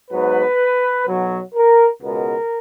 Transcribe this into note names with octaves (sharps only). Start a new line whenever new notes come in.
G#2 F#3 B3 B4
B1 B2 F#3
A#4
C#2 B2 G#3 B3 A#4